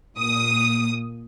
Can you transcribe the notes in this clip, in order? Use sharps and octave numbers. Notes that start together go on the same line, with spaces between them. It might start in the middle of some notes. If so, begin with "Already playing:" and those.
A#2 D#6